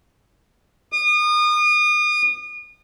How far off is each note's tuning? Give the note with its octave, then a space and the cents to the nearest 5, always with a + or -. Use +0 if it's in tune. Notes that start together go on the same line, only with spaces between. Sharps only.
D#6 -35